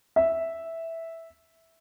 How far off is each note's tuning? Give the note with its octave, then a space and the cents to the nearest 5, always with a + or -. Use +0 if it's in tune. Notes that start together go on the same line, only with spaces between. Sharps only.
E5 -5